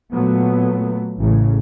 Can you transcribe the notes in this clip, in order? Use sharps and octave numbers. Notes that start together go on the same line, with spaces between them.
A#2 F#3 A3 B3
A1 C#3